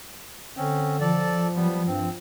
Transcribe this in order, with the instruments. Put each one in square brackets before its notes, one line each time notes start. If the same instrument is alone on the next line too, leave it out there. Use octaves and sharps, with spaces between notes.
[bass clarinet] D3 [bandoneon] C4 C#4
[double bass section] F3 [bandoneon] A4 D5
[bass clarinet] F#3 [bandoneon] G3 B3
[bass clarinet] G2 [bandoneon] C4